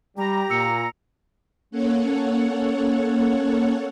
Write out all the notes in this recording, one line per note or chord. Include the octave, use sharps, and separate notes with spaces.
G3 G4 A#5
A#2 E6 C#7
A#3 C#4 A4 C#5 F#5